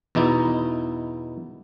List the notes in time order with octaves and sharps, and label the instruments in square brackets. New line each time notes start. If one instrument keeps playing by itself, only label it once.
[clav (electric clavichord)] E2 B2 D#4 E4